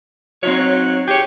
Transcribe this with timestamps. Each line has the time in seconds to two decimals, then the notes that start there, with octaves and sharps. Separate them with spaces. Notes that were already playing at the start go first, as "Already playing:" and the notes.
0.43 F#3 C4 D#4 C#5
1.08 G4 G#4 C#5